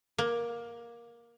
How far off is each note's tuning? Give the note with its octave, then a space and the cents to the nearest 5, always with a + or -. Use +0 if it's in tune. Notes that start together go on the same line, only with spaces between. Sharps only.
A#3 +15